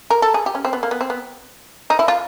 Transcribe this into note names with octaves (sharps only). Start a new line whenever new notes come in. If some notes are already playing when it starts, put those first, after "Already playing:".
A#4
A4
G#4
G4
C#4
C4
B3
A#3
B3
C4
B3
D#4
E4
F4